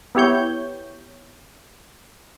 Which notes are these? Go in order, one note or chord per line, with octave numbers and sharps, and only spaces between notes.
B3 E4 G4 C#5 G6